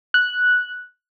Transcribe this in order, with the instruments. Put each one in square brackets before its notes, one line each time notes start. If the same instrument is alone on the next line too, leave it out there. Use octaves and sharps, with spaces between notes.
[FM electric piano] F#6